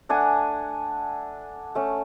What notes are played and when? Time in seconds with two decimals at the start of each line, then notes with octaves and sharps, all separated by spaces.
0.09 A3 D4 F#5 G#5
1.75 A3 C#4